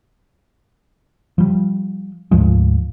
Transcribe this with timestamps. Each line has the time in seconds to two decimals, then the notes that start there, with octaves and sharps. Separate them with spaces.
1.38 F3 G3
2.31 D2 G#2 F3 G#3